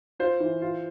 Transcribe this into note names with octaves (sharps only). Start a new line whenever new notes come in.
F4 C5
E3
F4